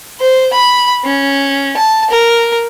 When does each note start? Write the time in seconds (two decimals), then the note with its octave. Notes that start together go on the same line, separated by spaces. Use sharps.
0.20 C5
0.53 B5
1.04 C#4
1.77 A5
2.10 A#4